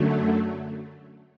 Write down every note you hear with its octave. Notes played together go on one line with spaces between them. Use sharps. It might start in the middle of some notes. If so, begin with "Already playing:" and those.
Already playing: F#2 D3 F#3 A3